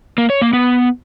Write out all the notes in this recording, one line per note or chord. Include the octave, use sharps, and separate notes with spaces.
A#3
C#5
A#3
B3